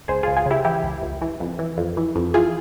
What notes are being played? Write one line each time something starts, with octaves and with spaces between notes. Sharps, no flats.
C#2 G#4 C5
C#2 F4 G#4
F4 G#4
C#3 E4 G4
E3 E4 G4
C#2
C#2
E3
F2
E3
F2
E3
F2
E3 F4 G#4